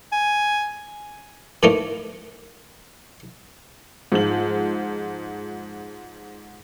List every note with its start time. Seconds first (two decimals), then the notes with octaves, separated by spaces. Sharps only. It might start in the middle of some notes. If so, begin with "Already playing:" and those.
0.12 G#5
1.63 A2 A3 A#3 D#4
4.12 G#2 F3 F4 F#7